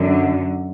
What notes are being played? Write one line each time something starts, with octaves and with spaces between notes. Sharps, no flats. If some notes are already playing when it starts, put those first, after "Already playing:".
Already playing: F#2 D3